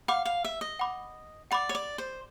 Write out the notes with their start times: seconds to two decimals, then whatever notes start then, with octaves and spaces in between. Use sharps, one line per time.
0.08 F5 F#5 B5 D6
0.25 F5
0.44 E5
0.61 D#5
0.79 F#5 B5 D6
1.51 D5 F#5 B5 D6
1.69 C#5
1.75 D5
1.98 C5